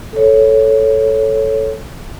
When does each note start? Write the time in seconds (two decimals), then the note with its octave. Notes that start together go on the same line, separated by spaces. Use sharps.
0.13 A4 C#5